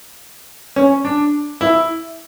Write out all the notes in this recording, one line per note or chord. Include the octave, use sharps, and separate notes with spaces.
C#4
D4
E4